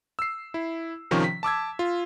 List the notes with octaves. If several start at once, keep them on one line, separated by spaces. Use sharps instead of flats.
E6 C7
E4
C3 D#3 F3 C#4 C#6
B6
A5 D6 E6 G#6
F4